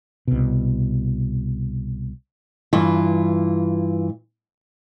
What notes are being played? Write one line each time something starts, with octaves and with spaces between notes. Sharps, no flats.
C2 B2
G2 E3 F4